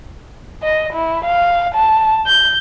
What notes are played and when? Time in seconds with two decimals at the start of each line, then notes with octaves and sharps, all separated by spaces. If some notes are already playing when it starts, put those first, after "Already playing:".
0.63 D#5
0.93 E4
1.25 F5
1.74 A5
2.26 G6